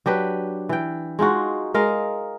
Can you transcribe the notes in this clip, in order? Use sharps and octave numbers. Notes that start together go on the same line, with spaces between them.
F#3 D4 G4 B4
E3 G5
G#3 D#4 F4 F#4
G#3 A#4 D#5 F5